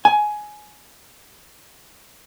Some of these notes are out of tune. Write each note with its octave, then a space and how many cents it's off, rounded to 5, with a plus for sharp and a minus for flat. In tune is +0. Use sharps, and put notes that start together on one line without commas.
G#5 +15